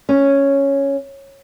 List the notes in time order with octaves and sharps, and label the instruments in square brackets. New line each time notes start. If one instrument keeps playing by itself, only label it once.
[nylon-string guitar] C#4